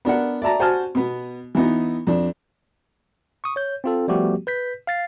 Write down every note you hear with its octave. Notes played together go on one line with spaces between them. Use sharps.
B3 D4 A#4 F#5
D5 E5 A5 A#5
F#4 C5 G#5 A5 F6
B2 B3
E3 B3 D#4
F2 D4
C#6 D#6
C#5 G6
C4 F4 A4
F3 G3 A3 B3 F#4 G4
B4 G6 B6
F5 A6 C7